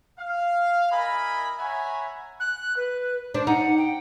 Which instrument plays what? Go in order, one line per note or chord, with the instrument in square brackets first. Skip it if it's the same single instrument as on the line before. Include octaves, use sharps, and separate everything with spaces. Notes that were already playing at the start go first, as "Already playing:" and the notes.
[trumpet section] F5
E4 A#4 D#5 G#5 B5
C#5 E5 F#5 G#5 A#5 B5
[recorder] F#6
B4
[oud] D4 [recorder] C5
[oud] D#4 [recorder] F#5
[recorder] G5